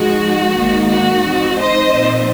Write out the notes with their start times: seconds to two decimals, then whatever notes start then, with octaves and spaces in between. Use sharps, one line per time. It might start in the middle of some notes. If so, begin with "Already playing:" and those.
Already playing: G#2 F3 G#3 D#4 F#4
0.56 G#1 G#2 D#3 A#3 D#4
0.90 F#4
1.24 G#2 F3 C4 D#4
1.58 C5 D#5
1.93 A#2 F3 C4 D#4